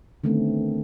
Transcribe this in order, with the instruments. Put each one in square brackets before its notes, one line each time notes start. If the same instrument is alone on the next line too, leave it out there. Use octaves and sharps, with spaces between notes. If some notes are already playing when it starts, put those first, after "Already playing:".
[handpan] D3 D#3 A3 B3 C4